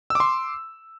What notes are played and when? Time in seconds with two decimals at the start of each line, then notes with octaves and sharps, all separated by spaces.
0.10 E6
0.15 D6
0.20 C6